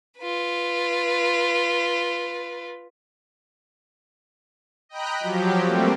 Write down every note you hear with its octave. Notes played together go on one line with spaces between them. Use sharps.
F4 B4
D#5 G5 A#5 B5 F#6
F3 F#3 G4
G3 A3 A#3 C4